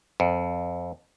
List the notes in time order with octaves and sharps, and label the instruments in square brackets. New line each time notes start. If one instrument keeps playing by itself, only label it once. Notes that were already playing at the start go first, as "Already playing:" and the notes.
[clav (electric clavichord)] F2